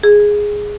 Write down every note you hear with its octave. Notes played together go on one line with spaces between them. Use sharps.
G#4